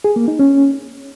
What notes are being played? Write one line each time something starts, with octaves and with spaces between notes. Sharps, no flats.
G#4
A#3
D#4
C#4